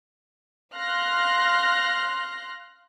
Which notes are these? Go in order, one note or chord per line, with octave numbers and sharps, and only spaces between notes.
F5 C6 F6 F#6 A#6